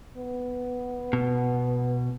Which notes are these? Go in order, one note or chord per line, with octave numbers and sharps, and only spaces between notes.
B3
B2